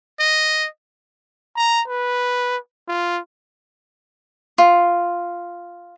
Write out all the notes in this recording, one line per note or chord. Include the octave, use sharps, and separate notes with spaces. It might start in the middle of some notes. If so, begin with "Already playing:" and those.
D#5
A#5
B4
F4
F4